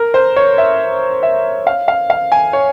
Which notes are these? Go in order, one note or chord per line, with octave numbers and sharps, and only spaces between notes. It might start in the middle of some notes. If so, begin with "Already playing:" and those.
Already playing: A#4
C5
C#5
E5
E5
F5
F5
F5
G#5
C#5